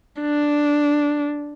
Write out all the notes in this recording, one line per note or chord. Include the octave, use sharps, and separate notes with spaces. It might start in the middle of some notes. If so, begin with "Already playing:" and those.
D4